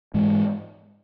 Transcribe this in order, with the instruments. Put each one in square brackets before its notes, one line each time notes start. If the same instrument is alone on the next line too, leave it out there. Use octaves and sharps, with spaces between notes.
[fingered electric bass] G#2 E3 G#3